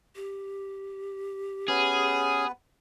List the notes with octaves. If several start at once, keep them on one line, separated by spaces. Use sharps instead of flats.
G4
B3 C#4 G#4 B4 G#5